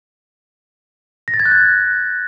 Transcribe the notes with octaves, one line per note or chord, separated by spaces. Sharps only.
A#6
A6
G#6
F#6
G6